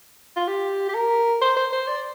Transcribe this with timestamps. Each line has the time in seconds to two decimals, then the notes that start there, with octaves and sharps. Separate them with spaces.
0.36 F4
0.48 G4
0.89 G4
0.94 A#4
1.41 C5
1.57 C5
1.73 C5
1.88 D5